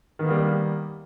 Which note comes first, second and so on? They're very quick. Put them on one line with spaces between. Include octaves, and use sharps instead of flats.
D#3 B3 A#3 G3